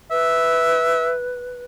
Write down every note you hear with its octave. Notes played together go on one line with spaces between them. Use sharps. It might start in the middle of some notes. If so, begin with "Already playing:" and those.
B4 E5